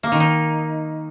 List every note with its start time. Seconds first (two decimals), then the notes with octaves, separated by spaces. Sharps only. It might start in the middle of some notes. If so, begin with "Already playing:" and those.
0.03 A#3
0.12 D#3
0.20 D#4